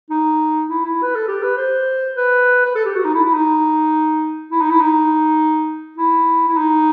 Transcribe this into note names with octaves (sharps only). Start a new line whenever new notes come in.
D#4
E4
E4
B4
A4
G4
B4
C5
B4
B4
A4
G4
F#4
D#4
E4
E4
D#4
E4
D#4
E4
D#4
E4
E4
D#4